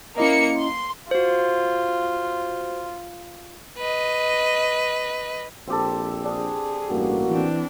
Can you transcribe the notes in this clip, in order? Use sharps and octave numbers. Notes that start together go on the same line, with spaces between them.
A#3 C#4 E4 D#5 C#7
C6
F4 F#4 C5
B4 D#5
A#1 C4 G4 A4
D4 G#4 D#6
A1 G2 A#3 F#4
E3 C4 D4